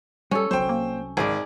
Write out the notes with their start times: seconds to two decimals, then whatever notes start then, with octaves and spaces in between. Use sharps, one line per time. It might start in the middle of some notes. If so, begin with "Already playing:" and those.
0.31 G3 C#4 A4
0.51 G1 C2 F#3 C5 G5
0.69 A#3
1.17 G#1 G#2 G#4 D5